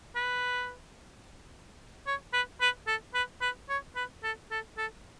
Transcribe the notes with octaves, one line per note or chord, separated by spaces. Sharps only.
B4
C#5
B4
B4
A4
B4
B4
C#5
B4
A4
A4
A4